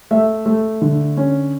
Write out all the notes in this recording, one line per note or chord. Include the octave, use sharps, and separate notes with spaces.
A3 E5
A3
D3
C#4